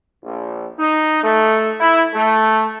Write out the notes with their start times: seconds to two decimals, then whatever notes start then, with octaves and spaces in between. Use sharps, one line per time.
0.24 A#1
0.79 D#4
1.24 A3
1.80 E4
2.15 A3